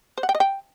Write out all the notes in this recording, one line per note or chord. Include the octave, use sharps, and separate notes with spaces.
C5
F#5
G5
D#5
G5